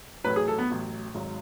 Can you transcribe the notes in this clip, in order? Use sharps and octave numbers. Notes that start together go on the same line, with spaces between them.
A1 A2 F#3 B4
G#4
A4
B3
A1 A2 F#3
G#1 G#2 F#3